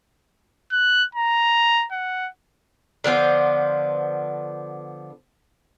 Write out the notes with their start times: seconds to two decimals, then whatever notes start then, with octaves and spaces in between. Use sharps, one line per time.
0.72 F#6
1.15 A#5
1.92 F#5
3.04 D3 F3 B3 C5